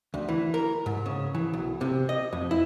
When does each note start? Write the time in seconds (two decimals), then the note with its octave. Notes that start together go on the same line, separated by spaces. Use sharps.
0.14 D2
0.29 E3
0.54 A#4
0.86 G#2
1.06 C#3
1.35 E3
1.54 B1
1.81 C3
2.09 D#5
2.33 F2
2.51 E4